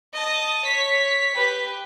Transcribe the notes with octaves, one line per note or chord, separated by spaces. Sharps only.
D#5 A5
C#5 B6
G4 B4